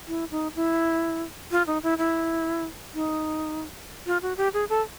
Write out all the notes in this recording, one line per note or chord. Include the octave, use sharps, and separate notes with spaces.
E4
D#4
E4
F4
D#4
E4
E4
D#4
F4
F#4
G4
G#4
A4